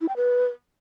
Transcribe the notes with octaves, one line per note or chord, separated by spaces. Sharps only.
E4
G5
B4